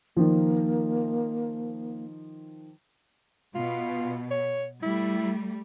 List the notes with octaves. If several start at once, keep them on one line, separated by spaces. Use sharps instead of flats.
D#3 F3 A#3
B2 F4
C#5
G3 A3 E4